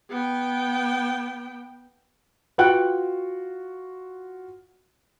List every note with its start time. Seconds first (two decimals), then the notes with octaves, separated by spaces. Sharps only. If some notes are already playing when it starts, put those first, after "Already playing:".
0.10 B3 G5
2.58 F4 F#4 B4 F#5 G5